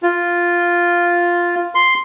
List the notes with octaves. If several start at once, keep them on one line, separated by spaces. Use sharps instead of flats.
F4
C6